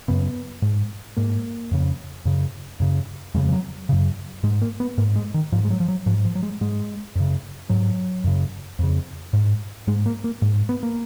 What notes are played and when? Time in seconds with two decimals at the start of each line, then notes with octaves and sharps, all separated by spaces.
0.08 F#2 C#3 B3
0.62 G#2
1.17 G#2 A#3
1.71 F2 C#3
2.25 F#2 C#3
2.80 F#2 C#3
3.34 F2 C#3 G#3
3.49 F3
3.52 F#3
3.89 F#2 C#3
4.43 G#2 G#3
4.62 A#3
4.80 B3
4.98 G#2 A#3
5.16 G#3
5.34 D#3
5.52 G#2 F3
5.65 G#3
5.70 F#3
5.80 F3
5.88 F#3
6.06 G#2 F3
6.25 F3
6.35 F#3
6.43 G#3
6.61 G#2 G#3
7.15 F#2 C#3
7.70 G#2 F#3
8.24 F#2 C#3
8.79 F2 C#3
9.33 G#2
9.87 G#2 G#3
10.06 A#3
10.24 A#3
10.42 G#2
10.69 B3
10.83 A#3